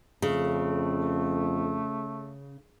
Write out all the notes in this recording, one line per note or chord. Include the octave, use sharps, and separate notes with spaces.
F2 C#3 A3